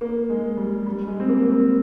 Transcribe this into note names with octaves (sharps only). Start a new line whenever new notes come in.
A#3
G#3
G3
G3
G#3
C4
A#3
A#3
C4